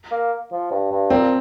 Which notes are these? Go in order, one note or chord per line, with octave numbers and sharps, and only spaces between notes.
A#3
F3
G2
G2
A#2 C4